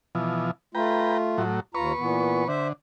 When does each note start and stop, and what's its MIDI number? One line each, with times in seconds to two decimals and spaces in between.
0.15 0.51 47
0.15 0.51 52
0.15 0.51 53
0.75 1.42 57
0.75 1.42 65
0.75 1.18 71
0.75 1.18 79
0.75 1.18 82
1.38 1.60 45
1.38 1.60 54
1.75 1.92 39
1.75 1.92 65
1.75 2.48 71
1.75 1.92 82
1.75 2.48 85
1.98 2.44 46
1.98 2.44 52
1.98 2.44 59
2.48 2.73 50
2.48 2.68 72
2.48 2.68 76